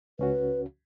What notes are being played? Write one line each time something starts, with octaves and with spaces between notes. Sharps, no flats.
C#2 C#4 F#4 B4